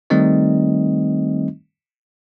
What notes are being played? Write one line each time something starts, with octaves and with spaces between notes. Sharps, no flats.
D#3 G3 A3 C4 D#4 D#5